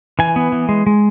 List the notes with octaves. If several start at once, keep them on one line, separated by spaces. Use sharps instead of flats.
E3 G#5
B3
E3
G#3
G#3